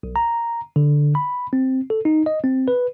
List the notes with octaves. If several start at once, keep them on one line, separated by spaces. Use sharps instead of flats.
B1
A#5
D3
B5
C4
A4
D#4
D#5
C4
B4